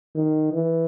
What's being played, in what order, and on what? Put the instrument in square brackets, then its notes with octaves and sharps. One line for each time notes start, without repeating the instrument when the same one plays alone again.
[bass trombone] D#3
E3